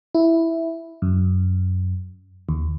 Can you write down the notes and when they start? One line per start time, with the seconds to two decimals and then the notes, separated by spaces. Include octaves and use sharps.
0.15 E4
1.02 F#2
2.49 D#2